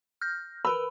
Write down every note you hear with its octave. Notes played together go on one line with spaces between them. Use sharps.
F6 G6 A#6
A#4 B4 B5 E6